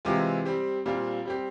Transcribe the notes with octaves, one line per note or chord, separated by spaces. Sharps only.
C3 E3 G#3 C4 F4
G3 C4 G4
A#2 G3 C4 F4
G3 C4 G4